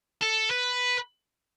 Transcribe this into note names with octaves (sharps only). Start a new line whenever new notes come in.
A4
B4